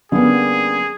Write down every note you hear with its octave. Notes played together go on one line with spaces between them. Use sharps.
D3 G3 A#3 B3 C#4 G#4